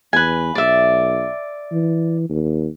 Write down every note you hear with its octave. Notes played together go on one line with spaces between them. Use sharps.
E2 B4 G#5
B1 D5 E5
E3
D#2